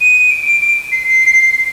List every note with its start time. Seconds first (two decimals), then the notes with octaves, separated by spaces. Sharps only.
0.01 D#7
0.31 D7
0.46 D7
0.60 D7
0.92 C7